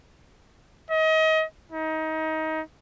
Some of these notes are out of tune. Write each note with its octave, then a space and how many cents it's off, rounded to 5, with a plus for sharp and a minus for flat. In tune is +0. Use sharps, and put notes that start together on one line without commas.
D#5 +30
D#4 +25